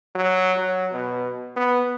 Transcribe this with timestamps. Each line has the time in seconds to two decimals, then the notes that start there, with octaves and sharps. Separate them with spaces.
0.15 F#3
0.57 F#3
0.93 B2
1.56 B3